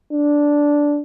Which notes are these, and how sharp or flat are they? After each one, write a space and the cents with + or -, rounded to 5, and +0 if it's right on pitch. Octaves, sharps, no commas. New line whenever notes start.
D4 -5